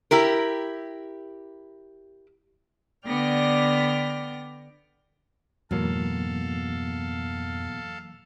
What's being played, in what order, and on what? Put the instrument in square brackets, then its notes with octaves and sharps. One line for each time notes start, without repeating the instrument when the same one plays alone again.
[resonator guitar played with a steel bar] E4 G4 A#4
[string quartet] D3 B3 D5 G5 F6 A#6
[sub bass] F2 [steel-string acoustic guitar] G#2 B2 [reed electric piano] E3 F#3 A#3 [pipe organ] A4 F5